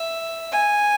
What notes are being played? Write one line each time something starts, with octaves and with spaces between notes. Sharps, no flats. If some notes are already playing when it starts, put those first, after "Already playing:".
Already playing: E5
G#5